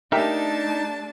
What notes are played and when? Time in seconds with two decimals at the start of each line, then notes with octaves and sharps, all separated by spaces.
0.12 A3 D4 D#4 G4 A#4 E5 A5